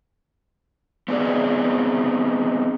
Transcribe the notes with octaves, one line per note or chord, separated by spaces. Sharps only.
B3 C4 D#4 G#4 D5